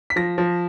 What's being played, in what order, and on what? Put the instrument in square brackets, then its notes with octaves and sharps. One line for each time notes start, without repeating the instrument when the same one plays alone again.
[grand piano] B6
F3 A#6
F3